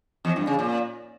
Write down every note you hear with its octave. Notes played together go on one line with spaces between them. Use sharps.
E2
G2
C#3
A#2